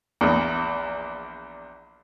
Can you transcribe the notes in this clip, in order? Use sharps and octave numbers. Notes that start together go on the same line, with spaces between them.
A#1 E2